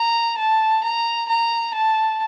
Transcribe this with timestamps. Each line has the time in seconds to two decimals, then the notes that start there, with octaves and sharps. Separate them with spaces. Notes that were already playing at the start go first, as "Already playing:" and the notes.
Already playing: A#5
0.37 A5
0.83 A#5
1.29 A#5
1.74 A5